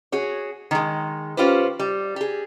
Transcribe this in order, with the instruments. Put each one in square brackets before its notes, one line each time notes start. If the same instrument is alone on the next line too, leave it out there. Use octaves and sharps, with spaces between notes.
[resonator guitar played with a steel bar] F#4 G#4 C#5
D#3 G#3
C#4 F4 G4 B4 C5
G3
G4 G#4